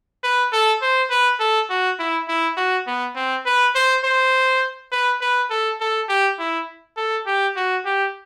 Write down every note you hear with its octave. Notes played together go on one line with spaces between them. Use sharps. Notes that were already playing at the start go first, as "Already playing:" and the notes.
B4
A4
C5
B4
A4
F#4
E4
E4
F#4
B3
C4
B4
C5
C5
B4
B4
A4
A4
G4
E4
A4
G4
F#4
G4